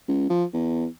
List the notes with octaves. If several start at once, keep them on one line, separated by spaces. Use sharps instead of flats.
C#2
F3
E2